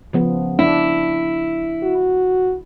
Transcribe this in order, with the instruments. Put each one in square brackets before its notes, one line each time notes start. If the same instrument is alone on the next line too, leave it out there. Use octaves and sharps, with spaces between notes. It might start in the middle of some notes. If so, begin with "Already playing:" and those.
[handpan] C#3 F3 B3
[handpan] D4 [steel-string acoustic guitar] E4
[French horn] F#4